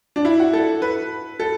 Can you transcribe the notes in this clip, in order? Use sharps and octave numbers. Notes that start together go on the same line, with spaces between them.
D4
E4
F#4
A4
B4
A4